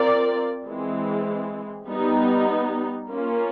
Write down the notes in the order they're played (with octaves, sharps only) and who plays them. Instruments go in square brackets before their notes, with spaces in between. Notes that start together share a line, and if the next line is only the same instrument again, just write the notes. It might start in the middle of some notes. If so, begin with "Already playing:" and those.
Already playing: [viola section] C4 F4 A#4 D5
E3 G#3 C4
G3 B3 D#4
A#3 C#4 F4